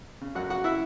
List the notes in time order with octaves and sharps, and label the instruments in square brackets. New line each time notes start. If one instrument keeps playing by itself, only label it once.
[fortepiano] C#3
F#2 F#4 F#5
C#3 F#4 F#5
E4 E5